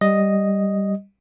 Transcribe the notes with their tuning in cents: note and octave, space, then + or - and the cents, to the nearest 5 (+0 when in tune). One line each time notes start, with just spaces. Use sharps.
G3 +0 D#5 +0